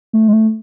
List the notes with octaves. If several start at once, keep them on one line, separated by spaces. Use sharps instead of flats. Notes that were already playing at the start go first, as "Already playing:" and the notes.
A3
G#3
A3